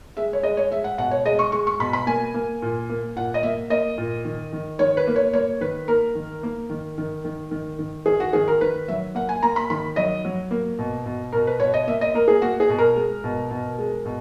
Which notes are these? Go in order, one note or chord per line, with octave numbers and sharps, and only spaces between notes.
G#3 E5
C#5
G#3 D#5
C#5
G#3 E5
F#5
B2 F#5
C#5
G#3 D#5
C#6
G#3 C#6
C#6
B2 B5
B5
A#3 G#5
A#3
A#2
A#3
A#2 F#5
D#5
A#3 E5
A#3 D#5
A#2
D#3
D#3
D#3 C#5
B4
A#3
C#5
A#3 C#5
D#3 B4
A#3 A#4
D#3
A#3
D#3
D#3
D#3
D#3
D#3
D#3 G#4
F#4
D#3 G#4
A#4
D#3 B4
F#3 E5
A#3 F#5
G#5
A#3 A#5
B5
D#3 B5
F#3 D#5
F#3
A#3
B2
B2
B2 A#4
B4
B2 C#5
D#5
A#3 E5
D#5
A#3 A#4
G#4
A#3 F#4
G#4
B2
A#4
G#3
B2
B2
G#3
B2